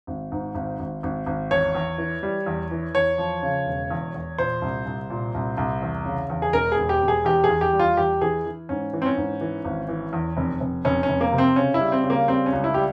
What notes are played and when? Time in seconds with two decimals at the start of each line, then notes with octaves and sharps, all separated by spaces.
0.07 G#1
0.32 G#2
0.55 G#1
0.79 G#1
1.03 G#1
1.26 G#1
1.51 E2 C#5
1.75 E2
1.98 E3
2.23 G3
2.46 E2
2.71 E3
2.95 E2 C#5
3.18 F3
3.43 C#3
3.66 E1
3.90 E2
4.14 E2
4.38 A#2 C5
4.62 C2
4.86 C2
5.10 A#2
5.34 C2
5.57 C2
5.82 E2
6.05 C#3
6.30 E2
6.42 G#4
6.53 E1 A#4
6.72 G#4
6.78 E1
6.89 G4
7.02 E1
7.08 G#4
7.25 E2 G4
7.44 G#4
7.49 E2
7.61 G4
7.73 G3
7.79 F4
7.97 E2 G4
8.21 E3 G#4
8.46 E3
8.69 G#2 C#4
8.93 E3
9.02 C4
9.06 C#4
9.17 G#2
9.41 E3
9.65 G#1
9.88 E3
10.13 E2
10.37 F1
10.60 F1
10.85 F1 C#4
11.03 C#4
11.09 F1
11.21 A#3
11.33 C3
11.38 C4
11.56 C#3 C#4
11.74 E4
11.80 G3
11.92 C4
12.04 C#3
12.10 A#3
12.28 G3 C4
12.46 C#4
12.53 C#2
12.64 E4
12.74 G3 G4